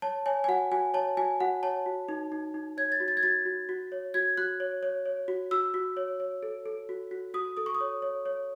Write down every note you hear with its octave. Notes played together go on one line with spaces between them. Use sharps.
C#5 A5
C#5 G#5
G#5
F#4 F#5
F#4 G#5
C#5 A5
F#4 G#5
F#4 F#5
C#5 A5
F#4
D#4
D#4
D#4
C#5 G#6
A6
F#4
A6
G#6
F#4 A6
F#4
F#4
C#5
F#4 G#6
F#4 F#6
C#5
C#5
C#5
F#4
F#4 E6
F#4
C#5
C#5
A4
A4
F#4
F#4
F#4 D#6
A4 D#6
C#6
D#6
C#5
C#5
C#5